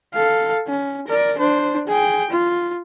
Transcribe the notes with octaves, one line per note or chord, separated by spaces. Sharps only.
A4 F5
C#4
A#4 D5
D4 C5
G#4 G5
F4